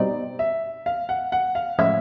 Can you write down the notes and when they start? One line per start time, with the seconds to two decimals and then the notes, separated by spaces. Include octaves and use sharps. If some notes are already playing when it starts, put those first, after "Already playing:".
Already playing: B2 G3 C4 D#4 D5
0.39 E5
0.86 F5
1.09 F#5
1.32 F#5
1.55 F5
1.78 A2 F3 G#3 C#4 E5